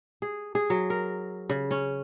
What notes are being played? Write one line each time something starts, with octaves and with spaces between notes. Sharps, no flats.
G#4
G#4
F#3
A#4
C#3
C#4